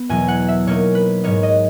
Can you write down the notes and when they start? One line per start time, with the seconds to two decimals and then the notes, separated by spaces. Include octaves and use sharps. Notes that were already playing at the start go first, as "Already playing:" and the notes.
Already playing: B3
0.09 E2 B2 F#3 G#5
0.28 F#5
0.48 E5
0.67 B2 A#3 D#4 C#5
0.95 B4
1.24 G#2 F#3 A#3 D#4 C#5
1.43 D#5